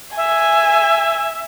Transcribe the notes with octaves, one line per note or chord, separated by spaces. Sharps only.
E5 G#5